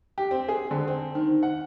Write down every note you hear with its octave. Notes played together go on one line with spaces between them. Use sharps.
G4
C4
G#4
D3
C4
D#3
F#5